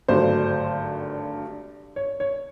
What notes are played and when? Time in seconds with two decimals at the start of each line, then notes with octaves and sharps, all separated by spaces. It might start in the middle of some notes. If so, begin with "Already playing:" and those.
0.08 G#1 G2 D3 F#3 A3 C5
1.96 C#5
2.20 C#5